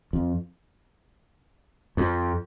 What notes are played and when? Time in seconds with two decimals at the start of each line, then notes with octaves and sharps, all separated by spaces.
0.13 F2
1.97 F2